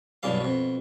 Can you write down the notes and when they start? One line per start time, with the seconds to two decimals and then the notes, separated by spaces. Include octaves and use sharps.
0.23 B1 E2 G2 B2 E3 F5
0.41 F2 B2